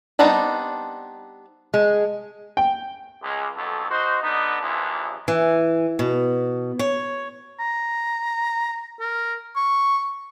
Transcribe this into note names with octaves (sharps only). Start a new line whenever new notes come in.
G3 B3 C4 D4 D#4
G#3
G5
C#2 G#3
B1 F2 F#3 A4
D#4 F#4 C5
D3 B3 D#4
A#1 D#2 E3 F3
E3
B2
C#5
A#5
A#4
C#6